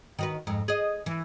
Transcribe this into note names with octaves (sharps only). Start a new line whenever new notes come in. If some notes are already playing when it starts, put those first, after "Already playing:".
D#3 F#4 B4
F2 G#2
G#4 D#5
E3